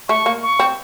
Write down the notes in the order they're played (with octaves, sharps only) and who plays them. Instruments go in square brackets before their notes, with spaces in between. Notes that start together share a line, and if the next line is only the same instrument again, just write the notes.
[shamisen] A3 [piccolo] C#6
[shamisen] A#3
[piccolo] C#6
[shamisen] C4